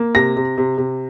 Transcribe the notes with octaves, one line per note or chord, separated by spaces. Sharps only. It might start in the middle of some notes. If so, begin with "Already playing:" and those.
Already playing: A#3
C3 A#6
C3
C3
C3